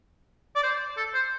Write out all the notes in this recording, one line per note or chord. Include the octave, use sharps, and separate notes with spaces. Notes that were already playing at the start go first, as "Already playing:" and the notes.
D5
C5
A4
C5